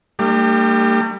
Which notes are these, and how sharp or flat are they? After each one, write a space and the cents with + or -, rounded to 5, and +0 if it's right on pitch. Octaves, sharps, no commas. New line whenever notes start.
G3 +10 A#3 -45 D4 +40